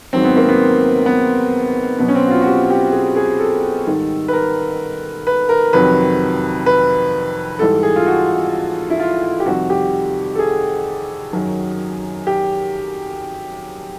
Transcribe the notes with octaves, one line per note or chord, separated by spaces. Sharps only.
G#2 D#3 F#3 C4
B3
A#3
B3
B3
B2 F#3 B3
C#4
C4
F#4
F4
F#4
G4
G4
G#4
G#4
A4
G#2 D#3 G3
B4
A#4
B4
A#4
F2 C3 D#3 F#3 B4
B4
G#2 E3 G3 A4
G#4
F4
F#4
E4
F4
G4
F2 C3 D#3 G3 F#4
G4
A4
G#4
F#2 D#3 F#3
G4